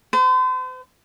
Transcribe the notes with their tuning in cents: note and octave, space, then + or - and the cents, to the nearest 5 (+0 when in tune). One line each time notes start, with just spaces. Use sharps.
C5 -40